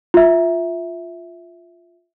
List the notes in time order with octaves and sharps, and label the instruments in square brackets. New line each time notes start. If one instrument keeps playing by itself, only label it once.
[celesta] F4 E5